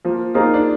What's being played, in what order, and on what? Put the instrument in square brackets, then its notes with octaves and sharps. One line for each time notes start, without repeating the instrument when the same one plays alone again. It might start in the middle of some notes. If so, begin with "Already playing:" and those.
[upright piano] F3 [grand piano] A#3
[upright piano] A#3 D#4 G#4 C5 [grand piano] F4
[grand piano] D4